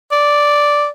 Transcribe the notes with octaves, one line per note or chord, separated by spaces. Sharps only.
D5